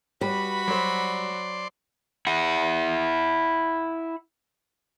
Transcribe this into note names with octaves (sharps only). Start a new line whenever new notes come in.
G3 F#4 B4 B5
F#3 C5 D5 C6
E4 F#5